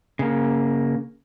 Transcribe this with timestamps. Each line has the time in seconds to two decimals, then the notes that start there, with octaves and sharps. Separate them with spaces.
0.19 C#3 A#3